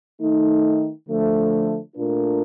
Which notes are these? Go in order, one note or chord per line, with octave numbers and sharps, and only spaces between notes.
D#3 A3 D#4
D3 F3 A3
A#2 A3 D4 F4 A#4